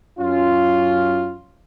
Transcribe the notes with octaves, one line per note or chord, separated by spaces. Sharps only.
F#2 C#4 F4